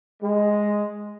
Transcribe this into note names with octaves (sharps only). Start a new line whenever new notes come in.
G#3